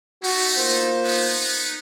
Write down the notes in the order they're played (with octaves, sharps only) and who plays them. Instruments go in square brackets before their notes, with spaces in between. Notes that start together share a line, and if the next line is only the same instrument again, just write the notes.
[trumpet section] A3 D#4 [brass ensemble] F#4
[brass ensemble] A#3 F4 C5
[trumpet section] B3 D#4